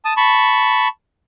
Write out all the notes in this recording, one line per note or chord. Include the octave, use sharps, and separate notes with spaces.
A5 D#6
A5 B5 C#6